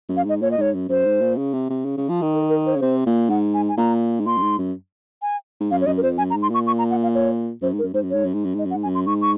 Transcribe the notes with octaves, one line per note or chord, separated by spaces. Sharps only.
F#2
F5
G#2 D#5
A#2 C#5
D#5
G#2 C#5
F#2
F#2 C5
G#2
A#2
C#3
C3
C3
C#3
C#3
F3
D#3
A#4
A#4
C5
C#5
C#3
C3 C5
A#2
G#2 F#5
G#5
G#5
A#2 A#5
G#2
A#2 C6
F#2
G#2
F#2
G#5
G#2
F#2 F5
C#5
F#2 D#5
A#4
F2 C5
F#2 G#5
A#5
G#2
C6
A#2 C#6
C#6
A#5
F#5
F5
C#5
F#2 C5
G#2
A#4
F#2
G#2 C5
F#2
G#2 C#5
F#2
G#2
F#2
G#2 D#5
F#2
F#5
G#2
F#2 G#5
C6
G#2 C#6
C#6